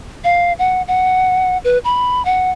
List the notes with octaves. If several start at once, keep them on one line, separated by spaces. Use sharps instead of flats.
F5
F#5
F#5
B4
B5
F#5